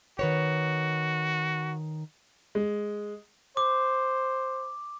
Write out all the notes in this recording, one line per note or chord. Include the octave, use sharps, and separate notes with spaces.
D#3 F#4 B4 C#5
G#3
C5 D6